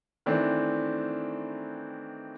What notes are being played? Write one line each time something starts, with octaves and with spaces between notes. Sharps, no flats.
D#3 E3 A3 C4 D4